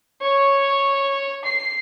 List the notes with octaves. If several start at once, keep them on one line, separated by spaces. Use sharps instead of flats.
C#5
C7